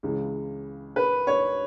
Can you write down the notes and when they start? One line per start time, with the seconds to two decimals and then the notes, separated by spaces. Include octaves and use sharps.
0.03 C#2 C#3 E3
0.96 B4
1.27 C#5